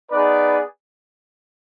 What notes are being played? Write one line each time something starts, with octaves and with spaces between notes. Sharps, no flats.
B3 D#4 G#4 B4 D5